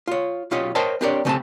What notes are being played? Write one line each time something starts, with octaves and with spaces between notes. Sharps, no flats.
F4 C#5
B1 C#4 F4 G4 C#5 D#5
A#4 C5 C#5 D#5 G5 A5
C4 D4 G4 A#4 C#5 D5
C#3 A3 C4 G4 G#5 A5